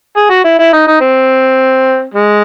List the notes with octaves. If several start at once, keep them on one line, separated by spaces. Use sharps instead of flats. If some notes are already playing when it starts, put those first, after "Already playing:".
G#4
F#4
E4
E4
D#4
D#4
C4
G#3